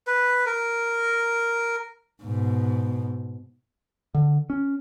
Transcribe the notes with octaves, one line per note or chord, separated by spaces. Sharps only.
B4
A#4
G#2 B2
D3
C#4